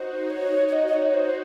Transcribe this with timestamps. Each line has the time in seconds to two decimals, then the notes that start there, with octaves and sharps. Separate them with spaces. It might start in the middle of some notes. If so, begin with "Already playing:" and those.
Already playing: D#4 F#4 C5
0.29 C#5
0.68 C#5
0.72 D#5
0.87 D#5
0.93 C#5
1.14 C5